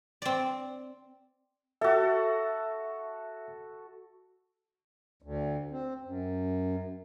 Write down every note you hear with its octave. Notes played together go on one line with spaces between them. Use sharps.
C4 D5
F#4 A4 E5
D2
C4
F#2